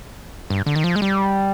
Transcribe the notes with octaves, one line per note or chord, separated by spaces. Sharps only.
G2
D3
D#3
F3
G#3
G3